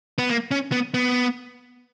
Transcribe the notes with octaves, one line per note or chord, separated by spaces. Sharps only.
B3
A#3
C#4
B3
B3